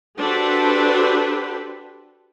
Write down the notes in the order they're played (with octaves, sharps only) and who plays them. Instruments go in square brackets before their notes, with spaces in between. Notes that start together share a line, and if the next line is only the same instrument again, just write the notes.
[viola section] D4 F#4 G4 A4 B4 C5